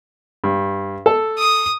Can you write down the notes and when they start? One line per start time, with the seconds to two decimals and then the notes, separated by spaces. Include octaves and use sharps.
0.44 G2
1.06 A4 A5
1.38 D#6